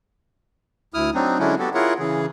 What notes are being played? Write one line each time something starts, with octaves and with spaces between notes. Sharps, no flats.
D2 E4 D#6 F6
F#3 C4 D4 D#4
D3 F#3 G#3 C#4 D4 E4
B3 F#4 G4 A4
E4 F4 G#4 A#4 C#5 F#5
C#3 E3 G#4